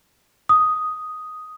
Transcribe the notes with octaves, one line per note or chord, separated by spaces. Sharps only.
D#6